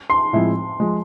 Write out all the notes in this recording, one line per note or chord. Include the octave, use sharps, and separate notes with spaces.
C6
A2 F3 G#3 C4 E4
F3 G#3